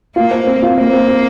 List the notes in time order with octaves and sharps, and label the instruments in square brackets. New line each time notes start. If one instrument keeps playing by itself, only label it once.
[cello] A#3 [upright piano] F4
[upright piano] C5
C4
F4
[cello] A#3 [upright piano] C5
[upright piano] C4
C4